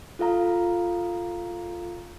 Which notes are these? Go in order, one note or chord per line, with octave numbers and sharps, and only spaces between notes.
F4 A4 F5 A#5